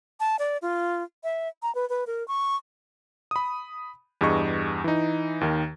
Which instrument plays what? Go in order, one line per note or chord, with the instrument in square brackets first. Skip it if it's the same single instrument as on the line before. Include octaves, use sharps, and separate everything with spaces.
[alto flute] A5
D5
F4
E5
A#5
B4
B4
A#4
C#6
[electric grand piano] B5 D#6
E2 G2 G4 G#4 D#5 C#6
E3 D#4
D#2 D#3